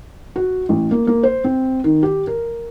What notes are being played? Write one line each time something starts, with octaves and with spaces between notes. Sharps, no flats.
F#4
A1
A#3
A#3
C5
C4
D#3
G4
A#4